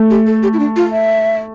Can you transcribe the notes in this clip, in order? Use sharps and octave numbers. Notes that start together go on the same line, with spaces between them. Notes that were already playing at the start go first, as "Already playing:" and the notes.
Already playing: A3
G4
A4
G4
E4
D4
F4
E5